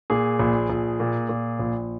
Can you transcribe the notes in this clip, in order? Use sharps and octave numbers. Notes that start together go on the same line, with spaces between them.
A#2 G#4
A#1
A#1
A#2
A#2
A#1